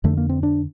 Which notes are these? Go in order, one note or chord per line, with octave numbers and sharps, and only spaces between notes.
F2 D3 A3
A#3
C4
D4